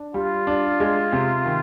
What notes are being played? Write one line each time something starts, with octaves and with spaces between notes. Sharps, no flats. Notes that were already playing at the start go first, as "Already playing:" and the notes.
Already playing: D4
G3 F4
D4
G#3
C3
D#3